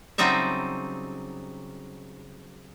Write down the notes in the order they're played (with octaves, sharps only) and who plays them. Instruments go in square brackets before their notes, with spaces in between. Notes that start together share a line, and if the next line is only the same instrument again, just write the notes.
[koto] C#3 F#3 G3 C4 D#4 E5